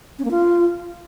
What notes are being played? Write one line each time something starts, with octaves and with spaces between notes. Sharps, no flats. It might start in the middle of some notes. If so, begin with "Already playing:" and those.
C#4
A#3
F4